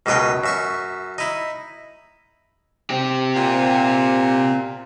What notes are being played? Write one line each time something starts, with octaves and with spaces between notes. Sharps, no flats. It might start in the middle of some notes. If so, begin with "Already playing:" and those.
C#2 F#2 B2 D#4 C#5 G5
F#2 E5 C#6
D#4 E4
C4 G4
A#2